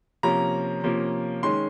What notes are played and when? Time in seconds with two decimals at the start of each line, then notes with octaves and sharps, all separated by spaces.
0.23 C3 F3 A#3 C#4 A#5
0.84 C3 F3 A#3 C#4
1.43 D#3 G#3 C#4 C6